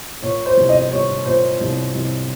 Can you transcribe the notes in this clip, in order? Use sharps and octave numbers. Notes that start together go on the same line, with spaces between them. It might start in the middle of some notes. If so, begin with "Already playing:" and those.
A#2 C#5
C5
C2
D#5
G3 C#5
A#2 C5
C2
C2